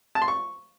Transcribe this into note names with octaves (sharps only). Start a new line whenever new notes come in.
A5
C6
C#6